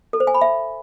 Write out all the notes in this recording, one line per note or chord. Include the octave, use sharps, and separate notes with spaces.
A4
C5
G#5
B5
E5